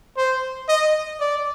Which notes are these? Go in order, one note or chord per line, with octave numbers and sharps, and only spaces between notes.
C5
D#5
D5